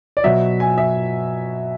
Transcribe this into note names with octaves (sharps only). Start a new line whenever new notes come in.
D5
B2 F#3 E5
G#5
E5